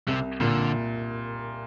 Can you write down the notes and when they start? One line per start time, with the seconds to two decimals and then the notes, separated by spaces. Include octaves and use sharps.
0.08 C2 C3
0.40 A#2 D3